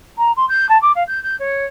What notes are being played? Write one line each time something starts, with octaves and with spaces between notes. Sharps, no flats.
A#5
C6
G6
A5
D6
F5
G6
G6
C#5